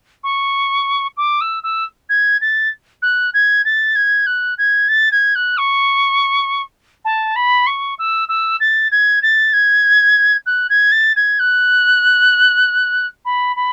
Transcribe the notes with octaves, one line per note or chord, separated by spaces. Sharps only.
C#6
D6
E6
E6
G#6
A6
F#6
G#6
A6
G#6
F#6
G#6
A6
G#6
F#6
C#6
A5
B5
C#6
E6
E6
A6
G#6
A6
G#6
F#6
G#6
A6
G#6
F#6
B5
B5